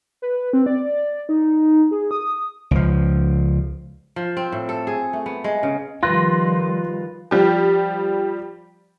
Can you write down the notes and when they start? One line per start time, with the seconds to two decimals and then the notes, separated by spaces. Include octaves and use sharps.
0.22 B4
0.53 C4
0.66 D5
1.29 D#4
1.91 G#4
2.11 D#6
2.71 C#2 F3
4.16 F3
4.37 C4
4.52 A2
4.69 A4
4.87 G#4
5.13 A3
5.26 B3
5.44 G#3
5.63 C#3
6.03 D#3 F3 G3 F4 B4 C6 F#6 A#6
7.31 F3 G3 G4